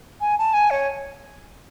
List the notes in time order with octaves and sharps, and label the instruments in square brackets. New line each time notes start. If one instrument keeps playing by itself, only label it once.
[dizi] G#5
A5
G#5
C#5